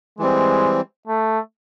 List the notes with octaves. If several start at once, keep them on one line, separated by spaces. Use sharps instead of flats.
E3 G3 G#3 C4
A3